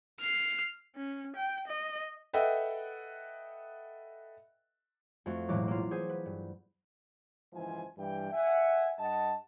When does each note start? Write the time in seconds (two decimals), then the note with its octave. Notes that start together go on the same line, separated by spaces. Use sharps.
0.20 F6 C7
0.96 C#4
1.37 G5
1.68 D#5
2.33 A4 B4 D#5 E5 F#5 G5
5.26 F2 A3 F#4
5.49 E1 A1 A2 F#3 D6 F#6
5.67 A#3 E4 F4
5.91 G#4 B4 C5 F#5
6.10 B4
6.26 G2
7.53 F#1 G#2 E3 F3 C5 G#5
7.97 G2 E3 G5
8.32 E5 F#5 G#5
8.98 G2 D#5 F#5 A5